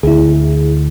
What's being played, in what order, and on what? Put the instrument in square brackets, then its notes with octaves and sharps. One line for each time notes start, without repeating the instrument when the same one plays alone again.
[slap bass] D2 [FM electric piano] E4 G#4